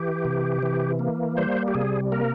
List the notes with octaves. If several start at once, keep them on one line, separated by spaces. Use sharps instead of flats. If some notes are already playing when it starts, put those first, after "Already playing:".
Already playing: E3 G4
C3
E3
A#3
G3 C5
G4
C3 G#4
A#3 A#4